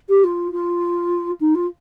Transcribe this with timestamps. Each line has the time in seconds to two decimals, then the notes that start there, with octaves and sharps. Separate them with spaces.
0.09 G4
0.24 F4
0.52 F4
1.40 D#4
1.55 F4